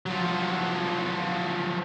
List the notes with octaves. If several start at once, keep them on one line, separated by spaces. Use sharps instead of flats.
F3 F#3